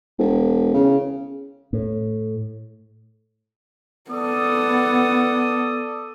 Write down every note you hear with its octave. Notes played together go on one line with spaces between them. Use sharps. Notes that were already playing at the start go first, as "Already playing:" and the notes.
E1
C#3
A2
B3 A4 D5 D#6